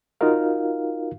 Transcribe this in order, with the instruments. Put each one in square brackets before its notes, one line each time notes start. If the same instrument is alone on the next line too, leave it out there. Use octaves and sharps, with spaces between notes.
[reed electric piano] D#4 F4 F#4 A#4 F5